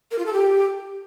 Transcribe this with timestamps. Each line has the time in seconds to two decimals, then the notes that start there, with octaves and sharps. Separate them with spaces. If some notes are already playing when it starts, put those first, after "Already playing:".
0.11 A#4
0.19 F4
0.26 A4
0.33 G4